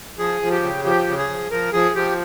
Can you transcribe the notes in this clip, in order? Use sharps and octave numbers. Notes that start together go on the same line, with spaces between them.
F3 G#4
F3
G4
C#3
F3 G4
C#3
G#4
F3
F3 A#4
F3 G#4
F3 G4